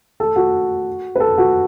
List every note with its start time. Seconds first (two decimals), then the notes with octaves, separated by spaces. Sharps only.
0.20 A4
0.36 F#4
1.15 B4
1.20 A4
1.38 F#4